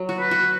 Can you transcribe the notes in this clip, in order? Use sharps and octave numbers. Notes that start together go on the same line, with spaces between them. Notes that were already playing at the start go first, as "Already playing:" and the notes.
Already playing: F#3
F#4
B4
F#4